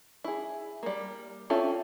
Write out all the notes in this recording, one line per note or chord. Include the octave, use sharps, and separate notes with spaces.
E4 G#4
G3 A#3
C4 C#4 E4 F4 A4